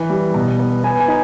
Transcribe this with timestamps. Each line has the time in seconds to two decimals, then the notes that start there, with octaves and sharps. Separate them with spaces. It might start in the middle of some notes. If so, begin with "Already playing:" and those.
Already playing: E3
0.10 G3
0.34 B2
0.59 B3
0.83 B3 G#5
1.00 G#5
1.08 D#4